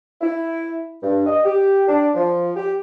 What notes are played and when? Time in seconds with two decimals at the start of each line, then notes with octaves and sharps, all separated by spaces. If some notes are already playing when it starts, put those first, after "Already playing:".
0.21 E4
1.02 G2
1.26 D#5
1.45 G4
1.88 D4
2.14 F3
2.56 G4